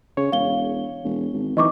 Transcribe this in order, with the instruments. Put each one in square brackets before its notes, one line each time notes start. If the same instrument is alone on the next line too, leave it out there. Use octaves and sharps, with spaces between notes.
[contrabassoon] C#3 [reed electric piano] C#5
[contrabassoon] E1 [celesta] F5 G7
[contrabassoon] E1
G#1
[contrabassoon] D1 [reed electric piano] E3 D#4 [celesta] D#5 C#6 D6